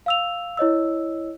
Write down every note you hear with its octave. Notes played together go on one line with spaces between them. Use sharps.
F5 E6 F7
E4 C#5 D#5 E6